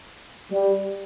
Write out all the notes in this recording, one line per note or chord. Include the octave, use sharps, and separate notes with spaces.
G3